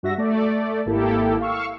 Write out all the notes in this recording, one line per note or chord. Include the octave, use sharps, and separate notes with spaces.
G2 F#4 E5 A#6
A3 D5
G#1 A#3 E4 G4 A4
F5 C#6 E6